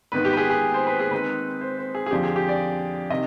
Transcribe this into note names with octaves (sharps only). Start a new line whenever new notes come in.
G#2 D#3 B3 D#4 B4
G4
B4
G#4
G#4
C5
B4
G#4
D#3 G#3 C4 D#4 B4
C5
C5
G#4
G#4
F2 D3 F3 G4
G#4
G4
D5
C3 D#3 D#5